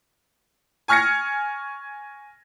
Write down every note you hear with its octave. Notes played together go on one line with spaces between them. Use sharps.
G#5 C#6 F6 G#6 A#6 C#7